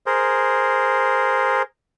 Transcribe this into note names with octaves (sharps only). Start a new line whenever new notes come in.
G#4 A#4 C5